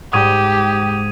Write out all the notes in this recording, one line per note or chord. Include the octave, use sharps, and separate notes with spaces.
G#2 G4 D#6 G#6 D#7